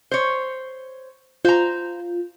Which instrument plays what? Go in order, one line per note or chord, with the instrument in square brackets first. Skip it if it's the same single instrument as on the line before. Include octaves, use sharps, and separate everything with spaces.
[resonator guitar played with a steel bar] C5 C#5
[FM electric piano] F4 [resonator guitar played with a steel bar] C5 A#5